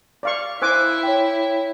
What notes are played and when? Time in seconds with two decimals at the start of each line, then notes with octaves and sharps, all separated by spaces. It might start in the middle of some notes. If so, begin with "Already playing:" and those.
0.23 D5 F5 C#6
0.62 E4 C5 G#5 D6 E6 F#6
1.03 C#5 G5